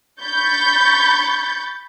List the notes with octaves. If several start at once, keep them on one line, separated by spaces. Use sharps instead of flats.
B5 C#6 G6 A6